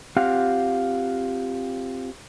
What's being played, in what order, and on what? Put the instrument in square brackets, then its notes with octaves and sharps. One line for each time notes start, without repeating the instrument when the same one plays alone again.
[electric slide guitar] C4 F4 G4 F5 F#5